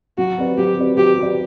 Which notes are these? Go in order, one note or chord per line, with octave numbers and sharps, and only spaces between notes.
F#3 F#4
C4 G4 B4 D5
F#3 G4
C4 G4 B4 D5
F#3 G4
C4 G4 B4 D5